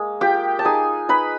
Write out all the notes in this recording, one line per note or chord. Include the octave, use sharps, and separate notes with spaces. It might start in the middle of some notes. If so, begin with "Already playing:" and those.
Already playing: G#3 A#3
F4 G4 G5
A5
D#4 G#4 G#5
D#4 B4 B5